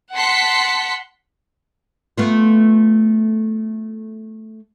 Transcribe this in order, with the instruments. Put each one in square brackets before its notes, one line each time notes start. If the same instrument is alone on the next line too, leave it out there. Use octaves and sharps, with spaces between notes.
[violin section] F#5 A5 C6 B6 C#7
[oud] A3 B3 F4